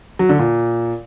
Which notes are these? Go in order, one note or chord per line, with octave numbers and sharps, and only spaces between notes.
F#3
D3
A#2